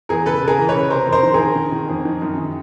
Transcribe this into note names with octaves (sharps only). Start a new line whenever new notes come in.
E2 G#4 A#4
C#3 A4 B4
C#3
G#4 A#4
E3
B4 C#5
C#3
C3 A#4 C5
F2
A#4 C5
D#3
G#4 A#4
D#3
D#3
D#3
F2
D#3
F#2
D#3